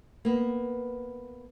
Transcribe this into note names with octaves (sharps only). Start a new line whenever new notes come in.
A#3 B3